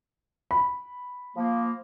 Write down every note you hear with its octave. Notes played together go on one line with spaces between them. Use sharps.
B5
F3 A#3